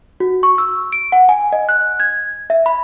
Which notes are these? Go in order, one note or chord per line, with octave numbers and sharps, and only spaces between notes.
F#4
C#6
E6
D7
F#5
G#5
D#5
F#6
G#6
E5
B5